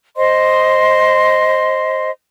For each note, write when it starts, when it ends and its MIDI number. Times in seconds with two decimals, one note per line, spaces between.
0.16 2.09 72
0.16 2.09 75
0.16 2.09 84